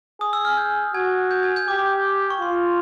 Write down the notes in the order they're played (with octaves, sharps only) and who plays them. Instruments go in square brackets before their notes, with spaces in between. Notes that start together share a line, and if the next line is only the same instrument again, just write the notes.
[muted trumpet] G#4 [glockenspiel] D#6
[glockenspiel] E6
F6
G6
[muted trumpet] F#4 [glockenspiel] G#5 G#6
[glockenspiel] G6
G#5 G#6
G6
[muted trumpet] G4 [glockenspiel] D6
[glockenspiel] C#6
[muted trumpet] F4 [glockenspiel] C6